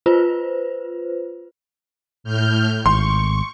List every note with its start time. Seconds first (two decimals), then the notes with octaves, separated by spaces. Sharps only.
0.06 F4 B4 C5
2.24 A2 F6 G6
2.86 G#1 C6 C#6